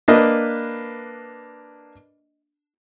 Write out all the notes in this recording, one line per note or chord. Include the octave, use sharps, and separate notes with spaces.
A#3 D4 B4 D#5